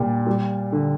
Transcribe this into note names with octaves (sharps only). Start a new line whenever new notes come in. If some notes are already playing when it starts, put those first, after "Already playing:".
Already playing: A#2 G3
G3
D3